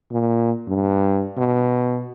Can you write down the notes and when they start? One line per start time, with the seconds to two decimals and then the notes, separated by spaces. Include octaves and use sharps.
0.12 A#2
0.67 G2
1.38 B2